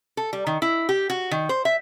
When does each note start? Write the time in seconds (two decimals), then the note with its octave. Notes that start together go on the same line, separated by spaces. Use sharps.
0.17 A4
0.33 G3
0.47 D#3
0.62 E4
0.89 G4
1.10 F#4
1.31 D#3
1.49 C5
1.65 E5